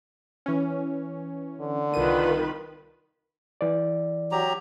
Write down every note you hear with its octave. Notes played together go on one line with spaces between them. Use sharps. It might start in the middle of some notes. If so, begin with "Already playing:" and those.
E3 C#4
D3
C2 D#3 F4 B4 D#7
E3 D5
F#3 G4 A#5